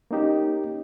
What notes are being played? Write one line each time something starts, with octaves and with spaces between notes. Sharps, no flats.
A#3 C#4 D#4 G4